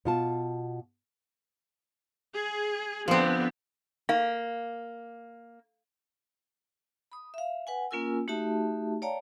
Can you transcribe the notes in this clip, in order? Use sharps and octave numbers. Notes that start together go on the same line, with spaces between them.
B2 F4 A5
G#4
D3 F3 B3 C4
A#3 F5
B5 D#6
E5 F5
B4 F#5 G#5
A#3 C#4 F4 A#4 G#5 E6
A3 D#4 F#4 G4 E5 A5
C#5 D5 F5 G5 A5 A#5